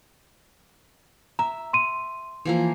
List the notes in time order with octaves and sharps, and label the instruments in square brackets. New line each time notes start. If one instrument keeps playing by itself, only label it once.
[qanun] E5 [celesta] A#5
[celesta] C6 D#7
[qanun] E3 F3 A#3